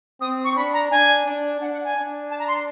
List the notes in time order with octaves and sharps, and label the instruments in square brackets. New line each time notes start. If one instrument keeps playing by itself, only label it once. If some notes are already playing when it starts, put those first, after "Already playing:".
[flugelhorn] C4 [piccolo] D#6
[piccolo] C#6
[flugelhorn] D4 [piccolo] B5
[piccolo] A#5
[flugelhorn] D4 [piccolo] G#5
[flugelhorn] D4
[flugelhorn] D4 [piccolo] F#5
[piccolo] F#5
G#5
[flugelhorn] D4
[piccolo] A5
A#5
C6